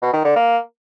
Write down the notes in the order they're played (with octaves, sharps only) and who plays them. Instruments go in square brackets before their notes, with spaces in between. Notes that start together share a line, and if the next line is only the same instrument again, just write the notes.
[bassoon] B2
D#3
D3
A#3